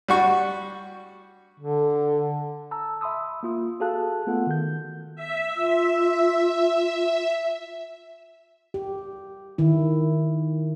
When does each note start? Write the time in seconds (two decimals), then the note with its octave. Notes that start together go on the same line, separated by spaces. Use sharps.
0.08 G3 F#4 C#6
1.60 D3
2.71 A5 A#5 E6
3.01 E5 B5 C6 D#6 E6
3.43 A#3 F4 D#6
3.80 F#4 G#4 A4 F5 A5 F#6
4.27 A3 B3 F4 A4 F#5
4.47 D#3 G6
5.16 E5
5.56 F4
8.74 G4
9.58 D#3 E4